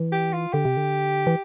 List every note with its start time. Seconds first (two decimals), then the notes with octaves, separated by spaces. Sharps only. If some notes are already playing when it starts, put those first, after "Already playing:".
Already playing: E3
0.12 G4
0.33 F4
0.53 D3 G4
0.65 C3
0.77 D3
1.27 E3